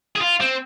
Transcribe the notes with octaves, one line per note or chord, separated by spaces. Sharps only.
G#4
F4
C4